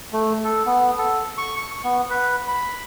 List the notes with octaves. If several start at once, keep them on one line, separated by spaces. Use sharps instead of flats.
A3
A4
B3
A4
C#6
C#6
B3
B4
B5